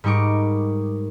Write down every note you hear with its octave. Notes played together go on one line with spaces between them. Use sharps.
G#2 G3 D#4 A#4 C#6 D6